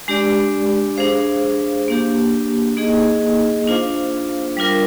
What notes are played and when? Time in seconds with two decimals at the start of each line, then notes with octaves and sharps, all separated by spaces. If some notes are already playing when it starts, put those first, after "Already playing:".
0.08 G#3 D4 G4 D5
0.97 D4 G#4 C5 F5
1.88 A#3 D4 G4
2.77 A#3 D#4 G#4 D#5
3.68 D4 F4 C5 F5
4.57 G3 D4 F4 A#4